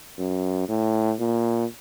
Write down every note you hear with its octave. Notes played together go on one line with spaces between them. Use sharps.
F#2
A2
A#2